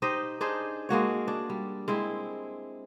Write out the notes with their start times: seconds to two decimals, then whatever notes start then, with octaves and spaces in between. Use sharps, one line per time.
0.02 D#4 G4 C5 D#5
0.41 D4 D#4 G#4 C5
0.89 G#3 A#3 F#4 C#5
1.28 D4
1.50 G3
1.88 G#3 C4 E4